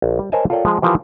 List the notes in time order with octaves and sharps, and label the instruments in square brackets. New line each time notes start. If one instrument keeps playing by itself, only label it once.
[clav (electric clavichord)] A#1
G3
A#4 C5 C#5 D#5 G#5 A5
F4 A4 A#4 C#5 D5 G5
F3 G#3
E3 F3 F4 G4 A#4